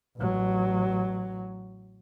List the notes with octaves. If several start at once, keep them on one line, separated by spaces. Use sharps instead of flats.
A1 F#3